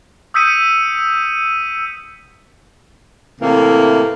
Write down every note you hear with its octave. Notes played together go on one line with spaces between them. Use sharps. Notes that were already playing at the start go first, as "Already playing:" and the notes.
D#6 E6 G6 B6 C#7 D#7
A2 C3 E3 A#3